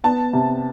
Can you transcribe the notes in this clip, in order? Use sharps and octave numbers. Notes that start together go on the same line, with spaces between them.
B3 A5
C3